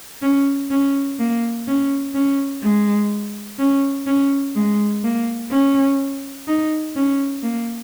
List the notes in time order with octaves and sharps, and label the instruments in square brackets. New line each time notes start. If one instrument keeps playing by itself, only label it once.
[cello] C#4
C#4
A#3
C#4
C#4
G#3
C#4
C#4
G#3
A#3
C#4
D#4
C#4
A#3